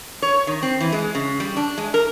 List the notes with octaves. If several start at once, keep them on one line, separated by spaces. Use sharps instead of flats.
C#5
D#3
C4
E3
G#3
C#3
G3
D4
G#3
A#4